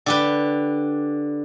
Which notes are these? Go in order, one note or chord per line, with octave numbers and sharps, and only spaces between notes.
D3 G4 B4